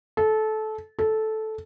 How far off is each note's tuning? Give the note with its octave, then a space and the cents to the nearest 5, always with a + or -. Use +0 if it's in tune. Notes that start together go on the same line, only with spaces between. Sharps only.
A4 -20
A4 -10